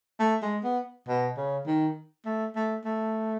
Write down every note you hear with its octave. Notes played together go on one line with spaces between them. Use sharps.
A3
G#3
B3
B2
C#3
D#3
A3
A3
A3